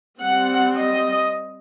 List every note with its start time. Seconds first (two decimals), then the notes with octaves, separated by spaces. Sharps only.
0.21 G3 C4 F#5
0.79 D#5